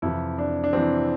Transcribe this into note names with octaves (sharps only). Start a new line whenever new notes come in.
F2 C3 E3 E4
D4
D4
F2 C3 E3 C4